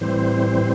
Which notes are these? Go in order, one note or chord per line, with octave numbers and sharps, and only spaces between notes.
A2 E3 G3 C4 C5